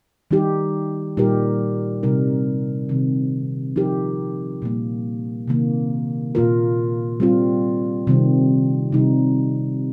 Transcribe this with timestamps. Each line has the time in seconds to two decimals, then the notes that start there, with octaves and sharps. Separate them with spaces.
0.31 D#3 G3 D#4 G4
1.17 A#2 G3 D#4 G4 A#4
2.03 C3 G3 D#4 A#4
2.89 C3 D#3 C4
3.76 F3 D#4 G4 A#4
4.62 A#2 G3 A#3
5.48 C3 D#3 A#3
6.35 A#2 A#3 F4 A#4
7.20 G3 C4 F4
8.07 C3 D#3 G3 C4
8.92 C3 G3 D#4